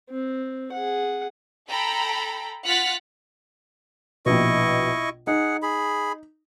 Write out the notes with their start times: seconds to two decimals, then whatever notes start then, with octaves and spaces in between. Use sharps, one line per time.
0.10 C4
0.72 G#4 F#5
1.68 A4 G5 A#5 B5
2.65 F4 F#5 F6 F#6 A6 B6
4.26 A#1 B2 E4 D#5 C#6
5.27 D#4 G#4 F#5
5.62 G#4 B5